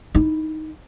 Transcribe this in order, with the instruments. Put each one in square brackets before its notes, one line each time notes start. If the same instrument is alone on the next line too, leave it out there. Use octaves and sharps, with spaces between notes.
[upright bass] D#4 E4